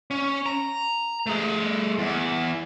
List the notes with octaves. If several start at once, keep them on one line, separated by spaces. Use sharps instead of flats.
C#4
A#5
A3 G#4
E2